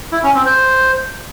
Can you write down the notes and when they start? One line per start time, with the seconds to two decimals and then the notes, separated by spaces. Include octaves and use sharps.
0.12 E4
0.23 C#4
0.35 C4
0.46 C5